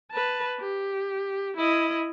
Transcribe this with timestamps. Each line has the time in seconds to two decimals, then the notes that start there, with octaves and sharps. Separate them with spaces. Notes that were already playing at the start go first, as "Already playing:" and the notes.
0.12 B4 A5
0.60 G4
1.56 E4 D#5